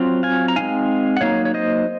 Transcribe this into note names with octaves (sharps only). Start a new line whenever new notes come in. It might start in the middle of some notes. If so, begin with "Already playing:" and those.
Already playing: F#3 C4 F4
F5 G#5
A#5
G#3 C4 D#4 F5 G#5
F#5
F#3 A#3 D#4 C#5 F5
C#5
C5 D#5